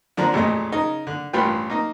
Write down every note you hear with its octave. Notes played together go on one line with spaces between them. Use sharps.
D3 F3 D4 A#5
A1 F2 A#2 G#3 A3 D#5
C#3 D#4
D3
A1 G2 F4 B4 G5
A#3 D#4